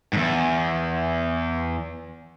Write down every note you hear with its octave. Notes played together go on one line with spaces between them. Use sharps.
E2 G#2